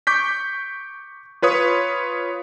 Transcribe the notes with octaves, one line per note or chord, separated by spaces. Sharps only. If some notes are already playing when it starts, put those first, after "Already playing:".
C#6 D6 G6 B6
F4 B4 C#5 D#6